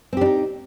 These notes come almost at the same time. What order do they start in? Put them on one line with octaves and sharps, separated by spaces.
C4 G4 D4 D#4